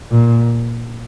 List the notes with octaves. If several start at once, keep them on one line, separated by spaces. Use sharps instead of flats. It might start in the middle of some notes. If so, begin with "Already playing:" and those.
A#2